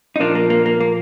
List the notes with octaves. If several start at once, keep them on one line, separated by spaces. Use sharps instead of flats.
D#4
A#2 F3 A#3 D4
A#3
A#3
A#3
A#3